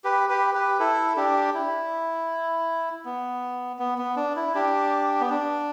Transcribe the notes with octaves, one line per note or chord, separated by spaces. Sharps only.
G4 B4
G4 B4
G4 B4
E4 A4
D4 G4
E4
B3
B3
B3
D4
E4
D4 G4
B3
D4